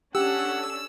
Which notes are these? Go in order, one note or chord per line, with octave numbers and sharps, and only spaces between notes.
C#4 D4 G4 A4 F#5 E6